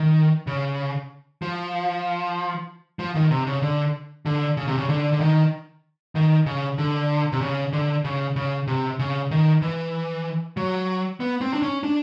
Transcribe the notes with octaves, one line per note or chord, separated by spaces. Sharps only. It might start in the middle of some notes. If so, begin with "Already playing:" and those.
Already playing: D#3
C#3
F3
F3
D#3
C3
C#3
D3
D3
C#3
C3
C#3
D3
D3
D#3
D#3
C#3
D3
C3
C#3
D3
C#3
C#3
C3
C#3
D#3
E3
F#3
B3
C4
D4
C#4
D4